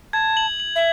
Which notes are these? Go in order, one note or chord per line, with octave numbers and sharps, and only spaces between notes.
A5 G#6
F#7
F#7
E5